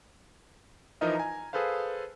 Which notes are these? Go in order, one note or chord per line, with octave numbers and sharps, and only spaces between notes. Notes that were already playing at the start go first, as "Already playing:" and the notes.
E3 F3 D#4 A#4 D#5 E5
G#5 A#5
G#4 A4 B4 C5 F5